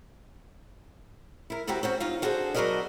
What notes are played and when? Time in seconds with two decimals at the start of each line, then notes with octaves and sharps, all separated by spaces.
1.50 E4 A#4
1.67 D2 C3 E4 F#4 G4 A#4
1.83 C4 C#4 F#4
2.00 D#4 F4 F5
2.22 D4 F#4 G#4 A4 C5
2.54 F#3 B3 F#4 A#4 D5 D#5